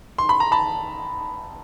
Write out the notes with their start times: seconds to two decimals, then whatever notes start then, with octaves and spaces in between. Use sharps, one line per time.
0.18 C6
0.29 B5
0.40 A#5
0.52 A5 B5